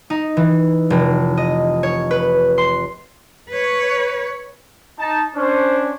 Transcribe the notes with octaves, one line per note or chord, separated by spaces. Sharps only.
D#4
E3
F1
D#5
C#5
B4
C6
B4 C#5
D#4 A5
C#4 D4 C5